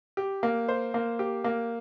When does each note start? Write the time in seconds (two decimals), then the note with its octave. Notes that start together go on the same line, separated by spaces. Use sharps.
0.17 G4
0.43 A#3
0.68 C5
0.94 A#3
1.19 G4
1.44 A#3